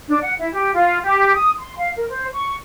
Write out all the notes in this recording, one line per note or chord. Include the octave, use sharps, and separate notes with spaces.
D4
F#5
E4
G4
F4
G4
D#6
C6
F5
A#4
C5
C#6